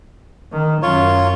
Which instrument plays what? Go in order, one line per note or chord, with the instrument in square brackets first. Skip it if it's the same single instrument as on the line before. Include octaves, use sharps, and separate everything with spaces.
[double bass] D#3
[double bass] F#2 [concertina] F4 C#5